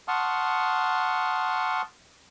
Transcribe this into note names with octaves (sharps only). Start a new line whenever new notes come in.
F#5 A5 C6 C#6 D#6 F6